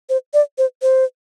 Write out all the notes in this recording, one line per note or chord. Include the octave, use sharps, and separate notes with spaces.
C5
D5
C5
C5